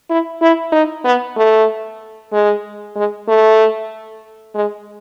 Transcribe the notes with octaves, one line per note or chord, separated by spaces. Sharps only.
E4
E4
D#4
B3
A3
G#3
G#3
A3
G#3